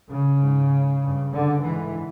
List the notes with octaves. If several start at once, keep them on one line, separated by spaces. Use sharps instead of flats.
C#3
G#2
G2
D3
G#2 E3